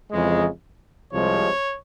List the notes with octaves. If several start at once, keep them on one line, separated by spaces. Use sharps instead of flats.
F2 C#3 E3 G#3
C2 C3 F3 G#3 C#5